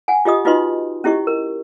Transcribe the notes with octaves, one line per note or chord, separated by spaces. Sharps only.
F#5 G#5
F4 G4 D#5 D#6
D#4 F4 F#4 B4 D#5 C6
C#4 E4 G4 D#5 C#6
A#4